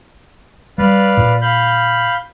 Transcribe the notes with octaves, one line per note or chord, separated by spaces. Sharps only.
G3 B4 D5 F5
A#2
F5 B5 G6